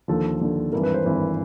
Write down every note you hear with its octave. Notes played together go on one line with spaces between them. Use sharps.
D#2 D3 F3 A4
D#2 D3 F3
G#1 G2 E3 A#4
B4
C5
G#1 G2 E3